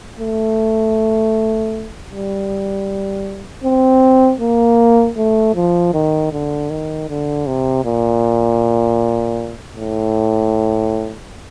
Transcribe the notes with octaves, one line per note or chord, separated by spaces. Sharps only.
A3
G3
C4
A#3
A3
F3
D#3
D3
D#3
D3
C3
A#2
A2